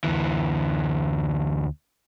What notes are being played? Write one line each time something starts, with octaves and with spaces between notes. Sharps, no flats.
D2 E3